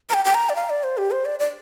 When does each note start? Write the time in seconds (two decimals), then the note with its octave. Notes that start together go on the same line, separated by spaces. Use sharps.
0.09 A#5
0.14 G5
0.25 G5
0.34 A#5
0.49 D5
0.55 F5
0.70 D5
0.83 C5
0.97 G4
1.11 C5
1.25 D5
1.39 D5